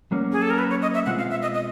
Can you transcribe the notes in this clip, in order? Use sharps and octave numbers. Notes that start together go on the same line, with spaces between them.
F#3 A#3 C#4
G#4
A4
A#4
B4
C#5
D#5
E5
B2 G#3 C4 F4 F#5
F5
E5
D#5
D#5